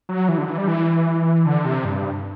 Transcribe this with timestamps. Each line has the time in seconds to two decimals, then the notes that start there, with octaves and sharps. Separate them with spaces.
0.09 F#3
0.29 E3
0.38 D3
0.48 E3
0.58 G3
0.68 E3
1.46 D3
1.65 C3
1.85 G2